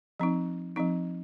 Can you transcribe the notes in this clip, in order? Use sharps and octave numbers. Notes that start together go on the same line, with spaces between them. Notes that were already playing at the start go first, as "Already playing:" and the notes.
F3 C4 D#4
F3 C4 D#4